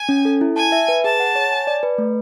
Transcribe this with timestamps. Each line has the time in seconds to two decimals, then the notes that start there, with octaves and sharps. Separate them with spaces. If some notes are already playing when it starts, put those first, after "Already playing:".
Already playing: G#5
0.09 C#4
0.25 A4
0.41 E4
0.56 G#5 A5
0.72 E5
0.88 B4
1.04 G#4 A5
1.20 F#5
1.35 C#5
1.52 G#5
1.67 D5
1.83 B4
1.98 A3